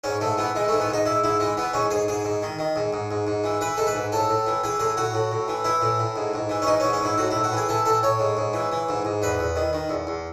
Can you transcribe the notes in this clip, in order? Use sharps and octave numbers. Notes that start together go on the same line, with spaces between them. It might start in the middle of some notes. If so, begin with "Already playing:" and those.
G#2 C#4
G#2 A3
E3 B3
E3 G#3
A3
G#2
B3
G#2 D#4
G#2 E4
G#2 E4
E3 G#3
E3 B3
G#2 C#4
G#2 G#4
G#2 G#4
G#2
D#3
D#3
G#2
G#2
G#2
G#2
E3
E3 B4
G#2 A4
B4
G#2
A2 A4
A2
E3
E3 G#4
A2 G#4
A2 F#4
A2
A2
E3
E3 E4
A2
A2
G#2
G#2
E3
C#4
E3 D#4
C#4
G#2
C#4
G#2 E4
A2 F#4
E4
A2
F#4
E3 G#4
E3 A4
A2 A4
A2 C#5
G#2
G#2
E3
E3
G#2
G#2
E2 B4
E2
D#3
D#3
E2
E2